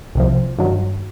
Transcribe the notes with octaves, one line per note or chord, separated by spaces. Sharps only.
C2 C3 F3
G2 D#3 F#3